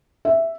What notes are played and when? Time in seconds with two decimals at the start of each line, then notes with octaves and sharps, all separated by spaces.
0.25 E5